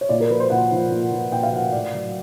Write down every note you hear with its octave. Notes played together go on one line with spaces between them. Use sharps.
C#5
A#2 D5
A#4
F3 B4
C5
A#2 F#5
F3
A#2
F3
A#2 G5
F5
F3 F#5
A2 D5
F#3